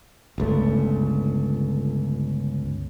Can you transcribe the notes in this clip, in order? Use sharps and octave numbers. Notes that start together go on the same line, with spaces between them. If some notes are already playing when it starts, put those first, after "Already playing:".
G1 C#2 A3